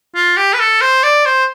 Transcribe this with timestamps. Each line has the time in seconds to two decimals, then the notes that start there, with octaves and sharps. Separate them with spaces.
0.15 F4
0.37 G4
0.54 B4
0.60 A4
0.81 C5
1.03 D5
1.25 C5